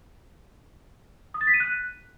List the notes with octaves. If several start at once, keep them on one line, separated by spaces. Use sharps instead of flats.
D#6
A6
B6
D#7
F#6